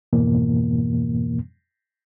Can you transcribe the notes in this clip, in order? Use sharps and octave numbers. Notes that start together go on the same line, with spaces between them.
F2 G#2 B2 E3 A#3